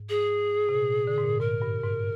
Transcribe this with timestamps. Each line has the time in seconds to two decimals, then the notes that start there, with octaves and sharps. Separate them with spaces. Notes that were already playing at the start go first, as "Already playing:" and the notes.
Already playing: G#2
0.09 G#4
0.69 C3
0.75 A#2
1.07 D3
1.18 G#2
1.24 A#2
1.40 G#2 A#4
1.62 G2
1.84 G#2